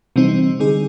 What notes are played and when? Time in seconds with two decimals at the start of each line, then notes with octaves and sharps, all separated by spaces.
0.16 C3 E3 G3 C4 D#4
0.59 D3 G3 C4 D#4 G#4